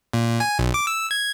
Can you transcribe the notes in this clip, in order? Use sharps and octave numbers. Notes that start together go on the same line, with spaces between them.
A#2
G#5
B1
D6
E6
G#6